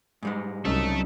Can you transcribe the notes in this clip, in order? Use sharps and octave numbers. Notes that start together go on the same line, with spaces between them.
G#2 G3 G#3
C2 C#3 F#3 D#4 A4 E5